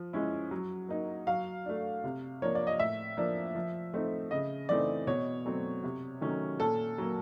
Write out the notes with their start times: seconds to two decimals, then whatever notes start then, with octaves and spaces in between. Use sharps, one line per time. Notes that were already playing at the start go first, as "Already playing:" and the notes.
Already playing: F3
0.13 G#3 C#4 E4
0.51 F#3
0.89 A#3 D#4
1.27 F#3 F5
1.66 A3 D4
2.04 C3
2.42 F3 A#3 D4 C#5
2.55 D5
2.67 D#5
2.80 A2 E5
3.17 F3 A#3 D4
3.55 F3
3.94 A3 C4 D#4
4.31 C#3 D#5
4.69 E3 A3 C4 D#4 D5
5.07 B2 C#5
5.45 F#3 A3 C4
5.83 C3
6.21 D#3 F#3 A3 C#4
6.60 A#2 A4
6.98 F#3 A#3